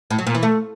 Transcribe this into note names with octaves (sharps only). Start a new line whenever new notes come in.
A2
F#3
A#2
E3
A3